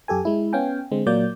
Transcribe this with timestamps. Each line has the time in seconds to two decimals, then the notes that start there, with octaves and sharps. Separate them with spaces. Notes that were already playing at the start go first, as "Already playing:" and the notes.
0.08 F#2 G4 A4 G#5
0.25 G#3 E4
0.53 B3 C#4 F5 G5 G#5
0.92 D3 G#3 C4
1.06 A#2 F#3 A#3 D5 G6